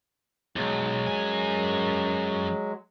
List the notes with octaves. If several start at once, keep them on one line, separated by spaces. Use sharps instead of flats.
B1 F#3 G#3
F#2 G#5